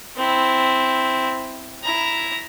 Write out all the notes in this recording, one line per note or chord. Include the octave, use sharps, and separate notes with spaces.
C4 E4
E4 A#5